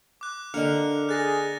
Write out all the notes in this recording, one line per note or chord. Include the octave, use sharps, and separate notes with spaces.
D6 F#6
D3 A#3 D4 A4 D#5 F6 C#7 F7
G#4 F#6 A6 A#6